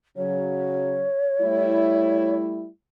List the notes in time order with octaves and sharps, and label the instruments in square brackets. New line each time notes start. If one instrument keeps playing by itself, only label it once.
[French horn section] C#3 F#3 [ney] C#5
[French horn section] G3 A3 E4